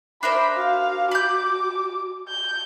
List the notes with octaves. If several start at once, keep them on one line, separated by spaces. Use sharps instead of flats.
D4 A#4 C5 E5 B5
F#4 F5
B5 D6 G6
G6